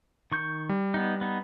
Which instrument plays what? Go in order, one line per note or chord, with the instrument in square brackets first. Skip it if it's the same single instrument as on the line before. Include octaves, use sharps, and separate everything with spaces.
[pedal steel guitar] D#3 C#6 G6
[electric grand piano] G3
[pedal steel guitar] B3 D#4
B3 D#4